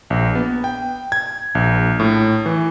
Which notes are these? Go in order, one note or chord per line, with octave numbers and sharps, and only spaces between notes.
A#1
B3
G5
G#6
A#1
A2
E3